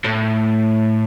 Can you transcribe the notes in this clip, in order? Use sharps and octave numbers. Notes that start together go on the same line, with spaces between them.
A2